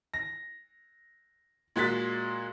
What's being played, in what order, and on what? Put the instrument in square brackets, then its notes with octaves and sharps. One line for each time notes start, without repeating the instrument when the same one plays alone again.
[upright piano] A#6
A#2 G#3 F#4 C6 A6 B6